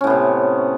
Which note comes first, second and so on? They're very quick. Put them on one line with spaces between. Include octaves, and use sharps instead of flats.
C#4 A2 B3 C3